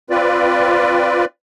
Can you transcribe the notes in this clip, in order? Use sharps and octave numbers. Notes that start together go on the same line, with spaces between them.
C4 F4 B4 D5